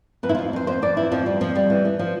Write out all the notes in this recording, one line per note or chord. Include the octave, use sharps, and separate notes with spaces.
F2 B4
E4
F4
F2
F2 C5
F2 C5
F2 D5
E3 E4
F2 F3
F2 G3
F2 F3
F2 G3
E3
E3
F3